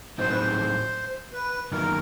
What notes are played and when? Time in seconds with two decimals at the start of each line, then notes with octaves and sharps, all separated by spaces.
0.18 A2 F#3 A3 C4 D#4 C5
0.29 B4
0.40 C5
1.33 B4
1.72 F#2 D#3 F#3 A#3 D#4 A#4